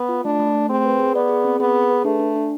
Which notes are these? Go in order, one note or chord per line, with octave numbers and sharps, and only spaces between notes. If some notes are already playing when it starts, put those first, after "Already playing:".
Already playing: B3
F4
A3 D4
A3
A3
C4 G#4
B4
G#4
B3 D5
G#4
C4
B3 G#4
G#4
B4
A3 D4
D4
D4